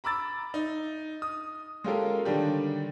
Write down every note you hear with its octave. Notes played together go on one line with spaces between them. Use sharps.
A#5 B5 D6 E6 A6
D#4
D#6
G#3 C#4 F4 G4 A4 A#4
D3 D#3 G3 D4 G4